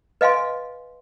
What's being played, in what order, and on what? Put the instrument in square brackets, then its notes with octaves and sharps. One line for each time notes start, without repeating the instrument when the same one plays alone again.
[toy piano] B4 D#5 F5 G#5 C6